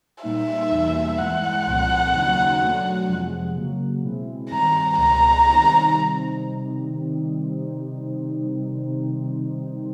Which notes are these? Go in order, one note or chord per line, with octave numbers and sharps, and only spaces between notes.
A#2 G3 A#3 D#4 E5
E2 B2 G3 A#3 D#4
G2 E3 G#3 F#5
C2 A#2 F3 A3 C4
D#2 C#3 F#3 A#3 D#4
B2 F#3 A3 D4
F2 C3 F3 G#3
C#3 F#3 A#3
B2 G#3 C4 E4
G2 D#3 G3 C4 A#5
C#2 B2 G#3 B3 A#5
C3 D#3 G3 C4 D#4